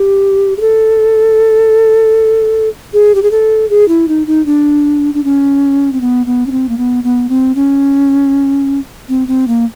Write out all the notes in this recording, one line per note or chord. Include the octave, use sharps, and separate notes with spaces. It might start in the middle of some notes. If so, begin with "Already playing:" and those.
Already playing: G4
G#4
A4
G#4
G4
G#4
A4
G#4
E4
D#4
D#4
D4
D4
C#4
C4
B3
B3
C#4
C4
A#3
B3
B3
C4
C#4
C4
C4
A#3